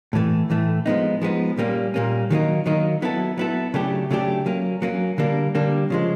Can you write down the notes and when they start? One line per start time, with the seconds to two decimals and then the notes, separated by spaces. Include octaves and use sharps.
0.13 A2 E3 A3
0.50 A2 E3 A3
0.86 F3 G#3 B3 D#4
1.22 F3 G#3 B3 D#4
1.57 A#2 G3 A#3 C#4
1.94 A#2 G3 A#3 C#4
2.30 D#3 F#3 A#3 D#4
2.66 D#3 F#3 A#3 D#4
3.02 F#3 B3 E4 A4
3.37 F#3 B3 E4 A4
3.74 C#3 F#3 A3 D4 G4
4.11 C#3 F#3 A3 D4 G4
4.46 F#3 A#3 C#4
4.82 F#3 A#3 C#4
5.18 D3 G3 A#3 D4
5.55 D3 G3 A#3 D4
5.90 C#3 F3 G#3